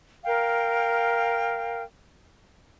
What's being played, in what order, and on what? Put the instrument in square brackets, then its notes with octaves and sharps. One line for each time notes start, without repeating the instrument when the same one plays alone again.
[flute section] A#4 F5 G5